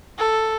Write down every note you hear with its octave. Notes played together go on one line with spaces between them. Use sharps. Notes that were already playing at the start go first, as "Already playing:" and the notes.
A4